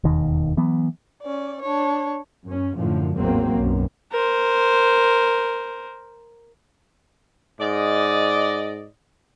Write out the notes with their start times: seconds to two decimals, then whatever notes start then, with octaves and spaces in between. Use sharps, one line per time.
0.04 E1 D#2 D#3
0.57 E3 F#3 B3
1.23 C#4 D5
1.62 D4 C#5
2.44 F#2 C#4
2.76 F#2 A2 D3 F3
3.15 A1 E2 G#2 F#3 A#3 C4
3.56 B1 F#2
4.12 A#4 C5
7.60 G#2 D5 D#5